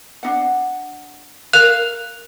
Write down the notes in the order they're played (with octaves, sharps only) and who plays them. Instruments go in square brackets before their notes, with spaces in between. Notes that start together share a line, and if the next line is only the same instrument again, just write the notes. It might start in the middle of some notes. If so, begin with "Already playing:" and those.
[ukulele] D4 D#4 F#5
[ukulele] A#4 F5 [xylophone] F#6 F7